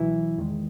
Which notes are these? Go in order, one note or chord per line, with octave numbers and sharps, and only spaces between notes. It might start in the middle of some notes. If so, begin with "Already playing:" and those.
Already playing: C#2 B2 E3 F#3 E4
E2 D#3 G#3